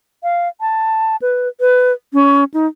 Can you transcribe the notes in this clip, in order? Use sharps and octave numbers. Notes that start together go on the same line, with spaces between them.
F5
A5
B4
B4
C#4
D#4